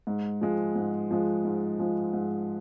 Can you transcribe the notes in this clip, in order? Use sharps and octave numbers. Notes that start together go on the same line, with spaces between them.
G#2
F3 G#3
G#2
F3 G#3
G#2
F3 G#3
G#2